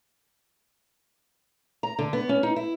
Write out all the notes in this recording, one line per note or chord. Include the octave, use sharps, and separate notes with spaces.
A#5
D3
B3
C#4
D#4
E4